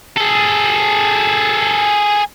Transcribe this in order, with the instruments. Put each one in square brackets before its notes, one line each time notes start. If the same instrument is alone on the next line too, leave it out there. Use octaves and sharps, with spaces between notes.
[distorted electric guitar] G#4 A4